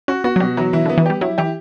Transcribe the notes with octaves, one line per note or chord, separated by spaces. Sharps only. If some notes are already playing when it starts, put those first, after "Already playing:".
C#4 F#4
B3 F#4
F#3
B2 G3
E3 F#3
E3 E4
D3 B3
E3
G3 G4
F#3 E4
E3 G4